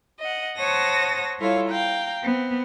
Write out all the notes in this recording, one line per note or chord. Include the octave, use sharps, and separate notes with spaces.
D#5 F#5
C5 C#5 F#5 A5 D#6 A#6
G3 E4 F4 A4 C#5 F5
F5 G5 A#5
B3 C4